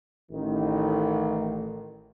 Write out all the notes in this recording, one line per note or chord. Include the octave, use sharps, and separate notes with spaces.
A1 D#3